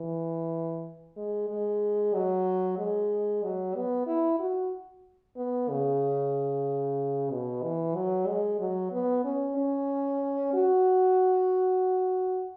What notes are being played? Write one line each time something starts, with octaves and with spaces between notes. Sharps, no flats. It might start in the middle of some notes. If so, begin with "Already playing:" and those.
Already playing: E3
G#3
G#3
F#3
G#3
F#3
B3
E4
F#4
B3
C#3
B2
E3
F#3
G#3
F#3
B3
C#4
C#4
F#4